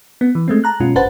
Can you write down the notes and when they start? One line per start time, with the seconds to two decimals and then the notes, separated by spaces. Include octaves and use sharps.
0.21 B3
0.35 E3
0.48 G#3 A3 C4
0.64 A5 A#5 F#6
0.80 F#2 B2 G#3 C#4 F4
0.96 G1 B4 C5 F#5 A5 A6